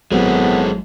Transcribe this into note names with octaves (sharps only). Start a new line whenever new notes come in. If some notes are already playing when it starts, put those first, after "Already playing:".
G#1 A2 F#3 G#3 B3 C4